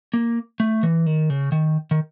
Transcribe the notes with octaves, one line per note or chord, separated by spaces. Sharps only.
A#3
A3
E3
D#3
C#3
D#3
D#3